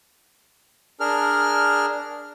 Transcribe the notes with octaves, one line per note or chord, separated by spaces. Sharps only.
D4 G#4 A#4 F6